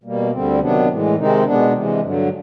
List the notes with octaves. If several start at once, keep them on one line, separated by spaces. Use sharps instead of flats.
B2 G3 A#3
D2 D3 G3 C4
C3 D#3 F#3 B3 D4
A2 E3 G#3
C3 D#3 G#3 C4 D#4
B2 G#3 B3 D4
C3 E3 G#3
G2 D3 F#3